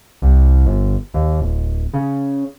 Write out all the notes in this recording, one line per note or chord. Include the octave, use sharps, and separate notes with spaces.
C2
G1
D#2
D1
C#3